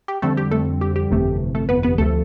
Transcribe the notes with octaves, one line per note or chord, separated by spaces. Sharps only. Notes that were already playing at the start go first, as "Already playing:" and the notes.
G4
F2 D3 G3 A3 C4 A4
G4
A3 A4
G4
G4
G1 F2 C3 E3 A3
A3 A4
B3 B4
B3 B4
D2 C3 F3 A3 A4